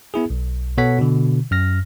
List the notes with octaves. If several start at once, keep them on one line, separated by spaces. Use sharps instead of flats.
B3 E4 G#4
B1
B2 B3 A4 C#5 F#5 B6
B2 D3
F#2 F6 A#6